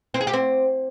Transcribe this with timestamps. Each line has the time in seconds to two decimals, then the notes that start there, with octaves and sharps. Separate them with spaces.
0.14 C4
0.21 G#4
0.27 G4
0.33 C4